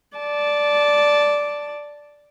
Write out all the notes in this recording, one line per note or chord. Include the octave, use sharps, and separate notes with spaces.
D5 A5